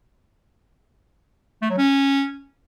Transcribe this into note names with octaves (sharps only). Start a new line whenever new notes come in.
A3
F#3
C#4